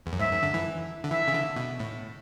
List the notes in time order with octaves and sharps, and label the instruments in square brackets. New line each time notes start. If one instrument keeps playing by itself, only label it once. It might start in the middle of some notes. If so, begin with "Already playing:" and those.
[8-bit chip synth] E2
F#2
[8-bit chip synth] G#2 [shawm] E5
[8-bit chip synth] F#2
D3
E3
D3
[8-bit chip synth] E3 [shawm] E5
[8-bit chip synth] C#3
D3
B2
A2